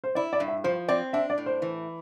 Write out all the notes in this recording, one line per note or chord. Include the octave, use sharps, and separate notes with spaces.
C5
E4 D5
D5
G2
E5
F3 C5
C4 D5
D4 E5
D5
A2
C5
E3